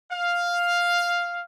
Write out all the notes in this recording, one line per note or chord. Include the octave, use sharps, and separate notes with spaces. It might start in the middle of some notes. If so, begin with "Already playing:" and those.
F5